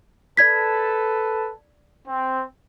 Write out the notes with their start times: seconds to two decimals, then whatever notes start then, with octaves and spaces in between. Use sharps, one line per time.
0.37 A4 B4 D5 A5 G#6 B6
2.06 C4